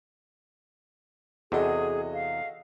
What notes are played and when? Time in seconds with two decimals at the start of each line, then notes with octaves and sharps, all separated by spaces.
1.52 E2 C3 F#4 G#4 A4 D#5
2.13 F5